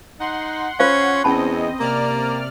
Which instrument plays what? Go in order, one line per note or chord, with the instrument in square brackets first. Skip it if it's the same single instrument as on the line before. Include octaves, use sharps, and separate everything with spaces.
[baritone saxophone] D#4 [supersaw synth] F#5 C6
[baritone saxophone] C#4 [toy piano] F4 C5 F5
[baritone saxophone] E2 [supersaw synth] C4 D#5 [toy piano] C#4 A5 B5
[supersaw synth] C3 D5 F6 [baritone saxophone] A#3